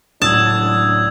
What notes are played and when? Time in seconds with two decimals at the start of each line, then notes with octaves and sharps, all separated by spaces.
0.22 C#2 A2 F#3 D4 A5 D#6 E6 G#6